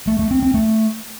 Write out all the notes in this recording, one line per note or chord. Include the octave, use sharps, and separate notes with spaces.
A3
A3
C4
C4
A3